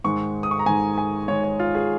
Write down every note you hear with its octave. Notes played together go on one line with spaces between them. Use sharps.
G#2 D#3 G#3 C#6
D#6
C#6
A#5
G#2 D#3 G#3 G#5
G#5
G#2 D#3 G#3 C#5
C#5
F4
G#4